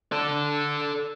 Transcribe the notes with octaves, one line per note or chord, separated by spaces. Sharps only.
A4 D5